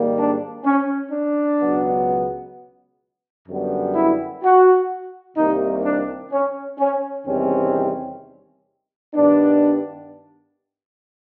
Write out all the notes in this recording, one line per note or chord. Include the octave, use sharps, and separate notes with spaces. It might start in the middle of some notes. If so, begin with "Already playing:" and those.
Already playing: G#2 D#3 G3 A#3
D4
C#4
D4
C#2 B2 F#3 B3
F#2 D3 G3 B3
E4
F#4
C2 C3 D#3 G3 A#3 D#4
D4
C#4
C#4
E2 C3 D#3 G3 C4 C#4
G2 D#3 G3 B3 D4